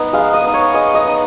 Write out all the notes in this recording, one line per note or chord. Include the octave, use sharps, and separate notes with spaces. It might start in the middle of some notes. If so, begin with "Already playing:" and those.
Already playing: B3 D#4
G#3 F5
D#5
B3 D#4
C#5
G#3 D#5
D#5
B3 D#4